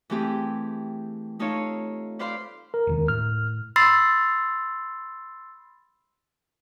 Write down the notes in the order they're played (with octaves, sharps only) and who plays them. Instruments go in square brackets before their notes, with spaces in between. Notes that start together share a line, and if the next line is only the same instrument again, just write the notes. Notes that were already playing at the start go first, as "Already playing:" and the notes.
[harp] E3 A3 C4 G4 G#4
A3 D#4 F4 A4 C#5 F5
B4 C5 D5 F5 B5 C6
[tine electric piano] A#4
[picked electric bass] E1 D2 D#3
[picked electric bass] A2 [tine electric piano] F6
[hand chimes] B5 C6 E6 A6 C7